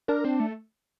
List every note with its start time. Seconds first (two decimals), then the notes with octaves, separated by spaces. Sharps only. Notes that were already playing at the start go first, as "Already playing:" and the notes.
0.08 D4 A#4
0.24 C4
0.40 A3